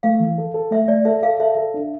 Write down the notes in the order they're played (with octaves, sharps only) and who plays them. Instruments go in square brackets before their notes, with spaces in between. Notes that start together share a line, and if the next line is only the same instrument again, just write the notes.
[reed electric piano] A3 [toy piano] F5
[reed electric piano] E3
A4
A4
[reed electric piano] A3 [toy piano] E5
[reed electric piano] A3 [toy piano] D5
[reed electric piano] A4 [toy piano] E5
[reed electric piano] A4 [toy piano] F5
[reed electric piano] A4 [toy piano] E5
[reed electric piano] A4
D4